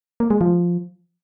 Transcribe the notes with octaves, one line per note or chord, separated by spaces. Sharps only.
A#3
G#3
F3